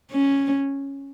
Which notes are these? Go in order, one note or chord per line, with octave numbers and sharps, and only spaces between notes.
C#4